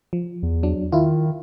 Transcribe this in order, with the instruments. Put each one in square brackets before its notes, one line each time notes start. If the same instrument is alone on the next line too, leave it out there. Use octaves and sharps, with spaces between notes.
[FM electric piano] F3
[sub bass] E2
[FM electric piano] F#3 D4
[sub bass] D#3 [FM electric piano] E4 F4